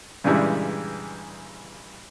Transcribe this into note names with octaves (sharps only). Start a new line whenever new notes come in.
G2 A#2 C#3 E3 G3 G#3